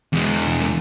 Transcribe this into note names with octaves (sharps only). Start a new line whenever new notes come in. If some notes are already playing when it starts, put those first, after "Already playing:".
E2 G#3